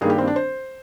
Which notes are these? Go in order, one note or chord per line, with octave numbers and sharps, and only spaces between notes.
G2 D#3 G3 A#3 G#4
G4
C4
D4
C5